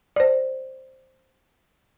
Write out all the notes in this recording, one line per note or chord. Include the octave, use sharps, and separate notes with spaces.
C5 D5